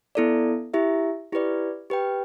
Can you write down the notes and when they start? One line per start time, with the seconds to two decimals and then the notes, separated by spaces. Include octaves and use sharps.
0.15 B3 E4 A4 D5
0.74 E4 G4 E5
1.32 E4 G4 B4 D5
1.90 G4 B4 G5